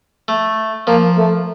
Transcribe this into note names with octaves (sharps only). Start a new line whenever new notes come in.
A3
F3 A#3
A3